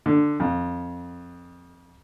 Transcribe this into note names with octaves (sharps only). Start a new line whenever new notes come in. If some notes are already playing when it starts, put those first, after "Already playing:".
D3
F2